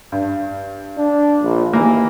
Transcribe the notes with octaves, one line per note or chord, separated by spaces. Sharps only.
G2
D4
A#1
D#2 E3 A#3